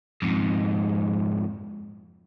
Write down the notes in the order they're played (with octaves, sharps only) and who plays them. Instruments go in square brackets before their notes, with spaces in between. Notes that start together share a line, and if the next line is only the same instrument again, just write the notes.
[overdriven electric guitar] F2 G#2